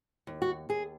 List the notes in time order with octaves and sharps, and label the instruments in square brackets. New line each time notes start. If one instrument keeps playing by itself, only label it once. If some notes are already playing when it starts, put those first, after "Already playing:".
[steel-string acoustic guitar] D#2
F#4
D#2 G#4